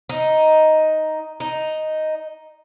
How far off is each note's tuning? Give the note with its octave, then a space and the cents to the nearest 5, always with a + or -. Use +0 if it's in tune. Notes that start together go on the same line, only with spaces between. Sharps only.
D#4 +5
D#4 +0